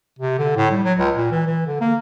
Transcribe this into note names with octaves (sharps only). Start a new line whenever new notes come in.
C3
D3
A2
G3
F#3
C#2
A#2
E3
E3
D3
A#3